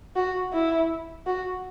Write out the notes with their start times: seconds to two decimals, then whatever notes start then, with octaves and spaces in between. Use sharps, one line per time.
0.16 F#4
0.53 E4
1.26 F#4